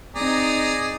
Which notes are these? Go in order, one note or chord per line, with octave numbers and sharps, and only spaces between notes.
C4 D#4 G#4 D5 A#5